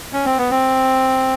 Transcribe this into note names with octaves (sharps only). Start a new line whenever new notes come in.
C#4
C4
B3
C4